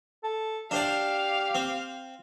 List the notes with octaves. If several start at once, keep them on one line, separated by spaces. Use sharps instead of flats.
A4
D4 G4 C5 D5 F5
C4